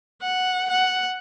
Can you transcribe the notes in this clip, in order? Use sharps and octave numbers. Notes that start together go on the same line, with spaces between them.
F#5
F#5